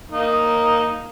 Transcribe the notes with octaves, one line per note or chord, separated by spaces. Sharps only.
A#3 D#4